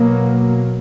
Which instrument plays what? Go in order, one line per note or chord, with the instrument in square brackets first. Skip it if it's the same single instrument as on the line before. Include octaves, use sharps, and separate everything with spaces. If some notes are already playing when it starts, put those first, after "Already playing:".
Already playing: [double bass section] B2 F#3 A#3